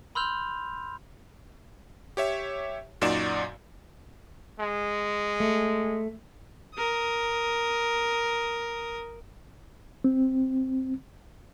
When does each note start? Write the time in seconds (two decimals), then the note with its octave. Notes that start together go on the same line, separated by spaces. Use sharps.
0.15 B5 C6 E6 F6 G6 F7
2.17 G4 C#5 E5
3.01 F#2 A#2 D#4 F#4 D5 E7
4.60 G#3
5.40 A3
6.75 A#4 D#6
10.04 C4